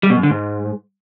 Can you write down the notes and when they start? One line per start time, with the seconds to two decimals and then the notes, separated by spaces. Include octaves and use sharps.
0.03 G3
0.10 B2
0.17 F#2
0.23 D3
0.30 G#2